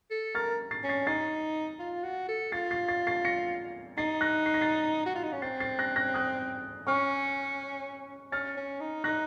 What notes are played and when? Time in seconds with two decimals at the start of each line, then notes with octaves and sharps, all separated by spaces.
0.11 A4
0.35 A#4 F6 A6
0.71 A6 C7
0.84 C#4
0.89 A6 C7
1.07 D#4 A6 C7
1.80 F4
2.03 F#4
2.29 A4
2.52 F4 A6 C7
2.71 A6 C7
2.88 A6 C7
3.07 A6 C7
3.25 A#6 C#7
3.98 D#4 A6 C7
4.21 F#6 A#6
4.46 C7
4.54 A#6
4.61 A6 C7
5.06 F#4
5.15 F4
5.23 D#4
5.33 C#4
5.42 C4 A6 C7
5.60 A6 C7
5.79 F#6 A#6
5.96 F#6 A#6
6.14 D#6 F#6
6.87 C#4 C#6 F6
8.32 C#4 F6 A6
8.57 C#4
8.80 D#4
9.04 D#4 F#6 A#6